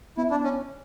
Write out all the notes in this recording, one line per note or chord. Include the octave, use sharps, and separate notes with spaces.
B3 E4
D4
C#4